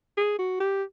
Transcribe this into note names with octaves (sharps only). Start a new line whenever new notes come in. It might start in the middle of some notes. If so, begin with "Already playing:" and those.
G#4
F#4
G4